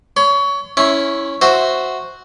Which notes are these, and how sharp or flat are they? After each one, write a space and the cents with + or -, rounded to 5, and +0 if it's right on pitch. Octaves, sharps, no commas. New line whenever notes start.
C#5 +25 C6 -40
C#4 +0 E4 -5 C#6 -45
F#4 +0 C5 +0 E5 -10